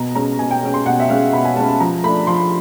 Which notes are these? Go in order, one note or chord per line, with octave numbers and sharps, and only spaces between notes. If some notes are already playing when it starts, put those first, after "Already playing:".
Already playing: B2 A#5
G#3 C#4 A#5
B2 G#5
G5
G#3 C#4
C6
B2 F#5
E5
G#3 C#4 F5
B2 B5
G#5
G#3 C#4 A5
A5
F3 A#5
A3 D4 B5
F3 C6